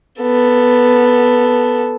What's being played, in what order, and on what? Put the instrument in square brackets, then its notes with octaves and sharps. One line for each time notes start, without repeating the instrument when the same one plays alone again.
[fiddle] B3 A4